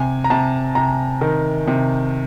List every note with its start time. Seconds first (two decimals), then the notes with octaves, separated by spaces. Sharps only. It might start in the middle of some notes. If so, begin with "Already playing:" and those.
Already playing: C3 G#5
0.24 A#5
0.30 C3 A5
0.75 C3 A#5
1.21 D#3
1.68 C3